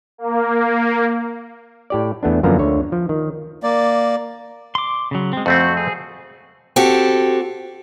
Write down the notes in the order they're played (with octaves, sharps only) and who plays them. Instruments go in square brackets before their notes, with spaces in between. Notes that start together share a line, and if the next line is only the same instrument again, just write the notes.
[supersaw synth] A#3
[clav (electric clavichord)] A2 G4 D5
E2 A3 B3 D4
F#2 D3 F3 A#3 B3 A#5
D2 D3 C#5
F3
D#3
[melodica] A#3 D5
[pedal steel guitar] C6 D6
C#3 F#3
G#3 C4
[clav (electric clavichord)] F2 A3 C4 [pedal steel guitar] F#4
[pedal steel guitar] G#4
[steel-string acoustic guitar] C4 F#4 G4 A4